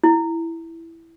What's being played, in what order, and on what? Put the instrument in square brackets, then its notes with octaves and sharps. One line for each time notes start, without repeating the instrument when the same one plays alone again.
[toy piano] E4